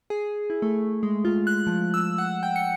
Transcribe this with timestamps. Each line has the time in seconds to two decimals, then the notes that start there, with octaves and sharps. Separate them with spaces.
0.10 G#4
0.50 E4
0.62 A3
1.03 G#3
1.25 F4
1.47 F#6
1.67 F3
1.94 E6
2.18 F#5
2.43 G5
2.56 C#7